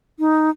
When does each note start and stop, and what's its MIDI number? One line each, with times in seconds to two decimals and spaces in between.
0.19 0.50 63